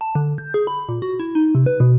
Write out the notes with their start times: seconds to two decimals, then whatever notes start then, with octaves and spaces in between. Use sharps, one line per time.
0.01 A5
0.15 D3
0.38 G6
0.54 G#4
0.67 B5
0.89 A#2
1.02 F#4
1.20 E4
1.35 D#4
1.55 C3
1.66 B4
1.80 B2